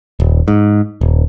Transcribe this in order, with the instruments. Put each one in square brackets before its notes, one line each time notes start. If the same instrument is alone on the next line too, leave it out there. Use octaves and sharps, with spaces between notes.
[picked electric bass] D#1
G#2
D#1